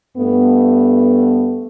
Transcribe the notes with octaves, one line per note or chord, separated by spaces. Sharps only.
G2 A3 B3